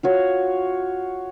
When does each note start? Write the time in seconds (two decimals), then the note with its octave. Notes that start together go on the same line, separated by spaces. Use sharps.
0.03 F4 F#4 C#5